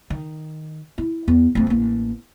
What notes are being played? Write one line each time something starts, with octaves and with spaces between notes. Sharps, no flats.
D#3
E4
E2
F2 A3
A1 A#3